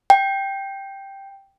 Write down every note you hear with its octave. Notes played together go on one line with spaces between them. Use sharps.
G5